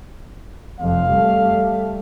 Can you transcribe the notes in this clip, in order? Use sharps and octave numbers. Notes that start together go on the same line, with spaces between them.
F1 F2 F5
G3 A3